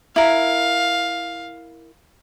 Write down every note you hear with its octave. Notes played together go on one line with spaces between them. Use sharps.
E4 A#4 F5